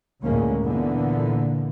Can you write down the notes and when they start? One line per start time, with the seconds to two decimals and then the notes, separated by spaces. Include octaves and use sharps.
0.23 D2 A2 D3 G#3 A#3 C#4
0.63 A#2 D3 E3 A#3 B3